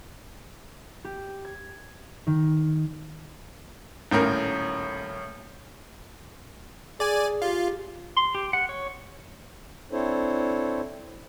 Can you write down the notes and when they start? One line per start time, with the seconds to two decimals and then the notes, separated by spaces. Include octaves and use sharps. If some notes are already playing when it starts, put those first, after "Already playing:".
1.05 G4
1.45 G#6
2.27 D#3
4.11 D#1 A2 C#4 A#4 G6
7.00 G#4 D5 G#5
7.42 F4 G4
8.17 C6
8.35 G4
8.53 F#5
8.69 C#5
9.92 C4 D4 E4 A4 C5 C#5